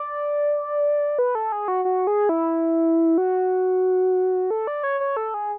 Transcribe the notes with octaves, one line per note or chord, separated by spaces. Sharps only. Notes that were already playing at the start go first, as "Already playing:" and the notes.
Already playing: D5
B4
A4
G#4
F#4
F#4
G#4
E4
F#4
A4
D5
C#5
C#5
A4
G#4